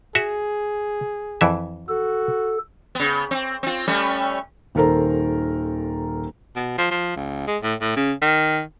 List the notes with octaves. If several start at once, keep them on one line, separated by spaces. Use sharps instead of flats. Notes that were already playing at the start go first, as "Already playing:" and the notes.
F#4 G#4 E5
F2 E3 E5
F#4 A4
C#3 B3
C4
C4 F4
G3 A3 C#4
D#1 D#3 A4 A#4 C5 A#5
B2
F3
F3
C#2
G#3
A2
A2
C#3
D#3